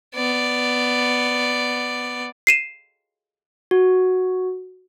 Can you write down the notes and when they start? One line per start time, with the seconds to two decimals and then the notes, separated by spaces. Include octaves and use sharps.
0.15 B3 D5
2.47 C7 D#7 E7
3.71 F#4